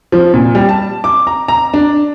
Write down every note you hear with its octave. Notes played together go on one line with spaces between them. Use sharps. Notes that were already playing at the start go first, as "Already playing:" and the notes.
F3
A#2
G3
A5
D6
A#5
A#5
D4